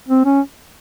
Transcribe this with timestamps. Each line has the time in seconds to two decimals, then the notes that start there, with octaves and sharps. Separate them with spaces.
0.08 C4
0.25 C#4